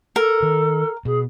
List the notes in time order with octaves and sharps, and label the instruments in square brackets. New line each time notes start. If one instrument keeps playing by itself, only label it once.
[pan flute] A4 [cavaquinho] A#4
[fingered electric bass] D#3
[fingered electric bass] B2 [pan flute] G#4